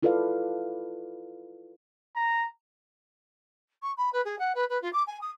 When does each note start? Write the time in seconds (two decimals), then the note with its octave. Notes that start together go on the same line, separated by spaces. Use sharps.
0.03 E4 F4 A4 B4 D5 F5
2.15 A#5
3.82 C#6
3.97 B5
4.13 B4
4.25 G#4
4.39 F#5
4.55 B4
4.69 B4
4.82 F4
4.93 D6
5.07 G#5
5.21 D#6